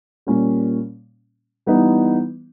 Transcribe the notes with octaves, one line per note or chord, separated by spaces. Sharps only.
A#2 G3 A#3 C#4
E3 G3 B3 D#4